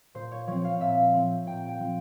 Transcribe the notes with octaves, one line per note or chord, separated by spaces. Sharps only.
A#2 C5
C#5
F3 C4 C#5
F5
A#2 E5
F3 C4
A#2 G5
G5
F3 C4